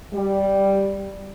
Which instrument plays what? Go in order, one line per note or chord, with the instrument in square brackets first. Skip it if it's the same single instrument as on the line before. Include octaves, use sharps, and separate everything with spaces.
[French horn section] G3